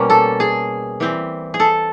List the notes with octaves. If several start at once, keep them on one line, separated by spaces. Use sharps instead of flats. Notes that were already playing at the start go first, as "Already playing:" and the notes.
Already playing: B2 G3 A#3 C#4
A4
G#4
E3 G3 C4
G#4
A4